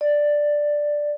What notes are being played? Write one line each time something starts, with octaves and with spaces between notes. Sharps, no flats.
D5